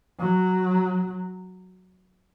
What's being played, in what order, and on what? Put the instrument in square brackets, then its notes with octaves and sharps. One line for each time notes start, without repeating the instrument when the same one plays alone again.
[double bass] F#3